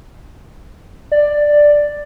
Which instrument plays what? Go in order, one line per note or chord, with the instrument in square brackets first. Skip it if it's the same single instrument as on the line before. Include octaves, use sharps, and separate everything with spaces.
[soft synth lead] D5